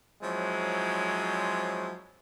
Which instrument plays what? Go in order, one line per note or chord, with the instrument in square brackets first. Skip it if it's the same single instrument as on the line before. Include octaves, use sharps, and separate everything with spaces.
[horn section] F3 F#3 G#3 C4 C#4 E4